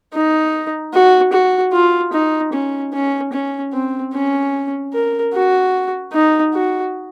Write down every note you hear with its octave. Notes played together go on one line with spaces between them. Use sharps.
D#4
F#4
F#4
F4
D#4
C#4
C#4
C#4
C4
C#4
A#4
F#4
D#4
F#4